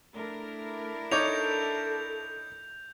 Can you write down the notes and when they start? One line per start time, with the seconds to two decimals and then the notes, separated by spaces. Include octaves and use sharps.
0.16 A3 D4 E4 A#4
1.11 D#4 A4 C#5 D6 G6 F7